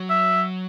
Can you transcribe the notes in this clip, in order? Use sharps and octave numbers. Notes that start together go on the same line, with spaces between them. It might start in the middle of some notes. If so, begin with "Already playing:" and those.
Already playing: F#3
E5